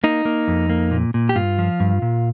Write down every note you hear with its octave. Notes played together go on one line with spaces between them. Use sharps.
A#3 D#4
A#3
F2
A#3
A#2
A#2
G4
G2 F4
F3
G2
A#2